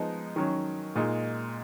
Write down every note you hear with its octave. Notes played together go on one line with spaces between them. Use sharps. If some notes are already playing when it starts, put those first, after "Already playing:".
Already playing: F3 G#3 B3 D#4
D#3 F#3 C#4
A#2 G#3 D#4